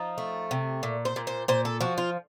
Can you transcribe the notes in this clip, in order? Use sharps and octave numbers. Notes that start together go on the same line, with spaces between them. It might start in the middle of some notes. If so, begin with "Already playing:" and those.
Already playing: F3 D#4
A3
C3
A#2
C5
A#2
C5
A#2 C5
A4
F3 F#4
F4